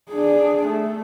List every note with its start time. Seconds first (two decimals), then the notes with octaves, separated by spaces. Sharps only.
0.11 D4 G#4
0.68 A3